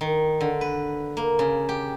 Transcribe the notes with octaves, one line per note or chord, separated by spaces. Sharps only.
D#3
D3
B4
A#3
C#3
G4